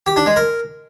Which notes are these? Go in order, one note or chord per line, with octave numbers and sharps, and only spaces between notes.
G4
D4
G#3
A#4